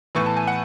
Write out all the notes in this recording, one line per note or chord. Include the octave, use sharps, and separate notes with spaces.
A2 E3 B3 C#6
A5
G#5
F#5